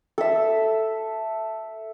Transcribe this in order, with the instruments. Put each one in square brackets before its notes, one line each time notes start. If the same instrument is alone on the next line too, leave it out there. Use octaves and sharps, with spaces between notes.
[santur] A4 E5